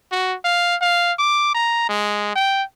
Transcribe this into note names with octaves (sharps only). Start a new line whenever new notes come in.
F#4
F5
F5
D6
A#5
G#3
G5